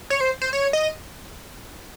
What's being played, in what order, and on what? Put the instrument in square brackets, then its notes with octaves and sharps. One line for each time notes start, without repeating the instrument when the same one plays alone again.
[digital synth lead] C#5
C5
C5
C#5
D#5